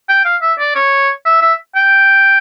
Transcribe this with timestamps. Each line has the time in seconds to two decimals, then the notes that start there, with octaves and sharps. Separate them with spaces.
0.09 G5
0.25 F5
0.42 E5
0.59 D5
0.75 C#5
1.25 E5
1.41 E5
1.76 G5